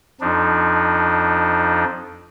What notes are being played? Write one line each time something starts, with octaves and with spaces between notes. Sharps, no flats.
F2 F3 D4 D#4